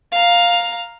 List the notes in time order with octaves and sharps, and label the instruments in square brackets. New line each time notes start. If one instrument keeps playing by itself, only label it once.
[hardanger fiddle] F5 A#5